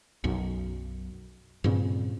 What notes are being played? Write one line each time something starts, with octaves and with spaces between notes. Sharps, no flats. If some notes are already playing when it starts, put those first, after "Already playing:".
B1 F#2
G2 A#2 C#3 C4